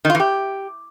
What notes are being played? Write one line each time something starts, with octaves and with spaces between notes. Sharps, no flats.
D#3
F4
E3
G4